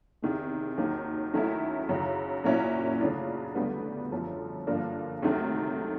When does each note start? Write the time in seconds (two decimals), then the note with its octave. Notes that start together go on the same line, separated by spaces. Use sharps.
0.22 E2 C3 D#3 G#3
0.77 D#2 D#3 F#3
1.34 D#3 F#3 A3 C#4 E4
1.89 F#2 C#3 F#3
2.44 A#2 F#3 A#3 C#4 E4
3.01 C#3 F#3 A3 D4 F4
3.55 D2 D3 G3 B3
4.12 F#2 D3 F3
4.67 G2 D3 F3 A#3 D4
5.22 D2 C3 D#3 F#3 A3